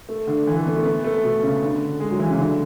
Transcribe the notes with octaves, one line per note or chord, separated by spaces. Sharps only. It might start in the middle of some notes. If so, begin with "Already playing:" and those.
A3
D3
E3
A3
B3
A3
B3
A3
B2
C#3
D3
G#3
F#3
E3
C#3
D3